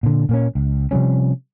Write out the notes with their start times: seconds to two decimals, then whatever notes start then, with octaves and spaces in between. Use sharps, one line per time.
0.03 A#2 D3
0.29 A#2 A#3 C#4
0.55 C#2
0.91 C3 F3 G3 C#4